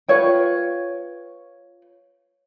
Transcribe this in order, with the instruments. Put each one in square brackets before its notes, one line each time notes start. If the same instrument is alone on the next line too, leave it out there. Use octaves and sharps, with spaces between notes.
[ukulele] F4 B4 C#5 G5